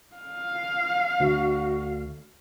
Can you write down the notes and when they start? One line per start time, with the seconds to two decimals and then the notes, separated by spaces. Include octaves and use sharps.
0.16 F5
1.20 D2 F#4